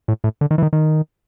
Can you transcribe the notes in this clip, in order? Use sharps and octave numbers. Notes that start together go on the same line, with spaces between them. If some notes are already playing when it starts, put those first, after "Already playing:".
A2
A2
D3
D#3
E3
D#3
D#3